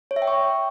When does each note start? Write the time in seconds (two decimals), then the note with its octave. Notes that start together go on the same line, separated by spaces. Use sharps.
0.11 C#5
0.16 E5
0.22 G5
0.28 C#6